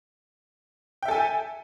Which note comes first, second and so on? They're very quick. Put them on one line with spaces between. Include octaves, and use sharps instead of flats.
G5 E5 A4 G#5